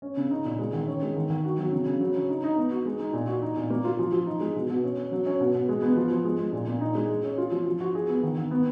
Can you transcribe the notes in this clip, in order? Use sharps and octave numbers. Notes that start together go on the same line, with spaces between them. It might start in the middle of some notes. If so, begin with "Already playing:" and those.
C#4
C#3
D#4
A#2
G#3
D#3
C#4
G#3
D#3
D#3
F#4
F#3
C#3
C#3
F#3
C#4
D#4
D#4
B3
F#4
G#3
D#4
A#2
F#4
D#4
A#2
A#3
F4
F3
F3
D#4
G#3
B2
B2
C#4
C#4
F#3
C#4
B2
B2
G#3
B3
F3
F3
G#3
G#3
A#2
A#2
D#4
G#3
G#4
C#4
F4
F3
F3
F#4
G#4
B3
D#3
D#3
B3